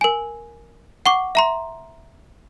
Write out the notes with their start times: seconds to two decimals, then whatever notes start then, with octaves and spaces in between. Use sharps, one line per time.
0.01 A#4 G#5
1.06 F#5 C#6 D6
1.35 E5 A#5 C6